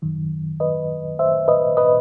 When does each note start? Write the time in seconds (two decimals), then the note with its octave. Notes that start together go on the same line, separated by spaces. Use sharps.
0.02 F#2 D#3 F#3
0.60 B4 D#5
1.19 C5 E5
1.48 B4 D#5
1.77 B4 D#5